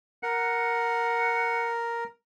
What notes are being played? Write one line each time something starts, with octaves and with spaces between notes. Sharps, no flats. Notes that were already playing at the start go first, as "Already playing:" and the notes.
A#4 F#5